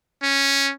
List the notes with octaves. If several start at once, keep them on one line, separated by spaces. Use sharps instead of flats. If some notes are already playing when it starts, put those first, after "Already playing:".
C#4